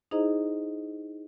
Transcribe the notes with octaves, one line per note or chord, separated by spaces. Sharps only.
D#4 E4 G#4 C5 D#5 A#5